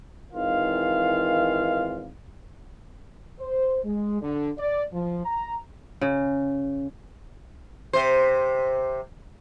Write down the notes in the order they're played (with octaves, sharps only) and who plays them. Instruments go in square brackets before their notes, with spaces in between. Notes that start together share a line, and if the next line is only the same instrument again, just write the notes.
[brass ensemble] G#1 D#3 E3 F4 F5
C5
G#3
D3
D5
F3
A#5
[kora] C#3
[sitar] C3 C5